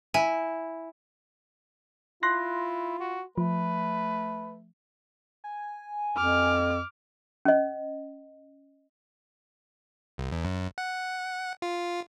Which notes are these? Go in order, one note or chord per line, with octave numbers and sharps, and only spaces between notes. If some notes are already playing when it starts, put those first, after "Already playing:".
E4 G#5
E4 F4 C6 F#6 A#6
F#4
F3 A3 B4
G#5
F2 D6 F6
C#4 D#5
C2
E2
F#2
F#5
F4